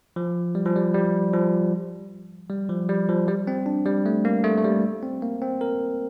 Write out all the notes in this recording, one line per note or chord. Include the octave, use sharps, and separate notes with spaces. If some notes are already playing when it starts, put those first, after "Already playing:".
F3
G3
F3
G3
G3
F3
G3
F3
G3
F3
G3
C4
D4
G3
A3
A#3
A3
A3
G3
C4
A#3
C4
A#4